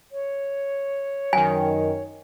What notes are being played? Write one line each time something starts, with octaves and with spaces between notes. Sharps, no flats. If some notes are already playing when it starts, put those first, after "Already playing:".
C#5
F#2 D#3 G#5